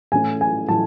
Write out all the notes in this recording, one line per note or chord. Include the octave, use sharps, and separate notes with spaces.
A2 E3 A3 C#4 G#5
G#5
A2 E3 A3 A5